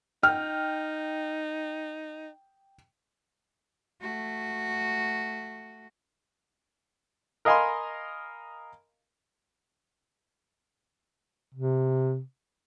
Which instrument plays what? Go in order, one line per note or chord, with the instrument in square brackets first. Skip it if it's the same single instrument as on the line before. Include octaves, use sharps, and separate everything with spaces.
[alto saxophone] D#4 [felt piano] G5 F6
[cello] A3 F#4
[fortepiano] A#4 D#5 F5 G#5 B5 C6
[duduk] C3